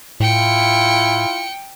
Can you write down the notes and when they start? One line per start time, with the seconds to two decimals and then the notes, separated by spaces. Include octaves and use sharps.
0.20 A2 E4 F4 G5 C#7